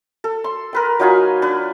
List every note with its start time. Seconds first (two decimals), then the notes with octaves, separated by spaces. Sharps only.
0.24 A4
0.44 C6
0.73 A#4 B4 G5
0.99 F#3 D#4 F4 G#5
1.42 D4 B4